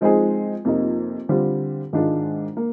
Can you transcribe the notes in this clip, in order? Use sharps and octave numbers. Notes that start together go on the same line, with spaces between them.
F3 G#3 C4 D#4 G#4
F2 C3 F3 A#3 D#4
D3 G3 C4 F4
G#2 D#3 G#3 D4 F4
A#3